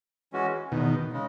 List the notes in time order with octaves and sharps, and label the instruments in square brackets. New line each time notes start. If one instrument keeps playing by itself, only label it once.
[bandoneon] E3 G#3 C#4 F#4
[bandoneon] E2 [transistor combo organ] B2 D#3
[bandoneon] C#3 G#3